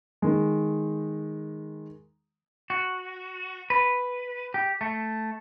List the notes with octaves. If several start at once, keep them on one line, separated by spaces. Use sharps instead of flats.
D#3 G#3
F#4
B4
G4
A3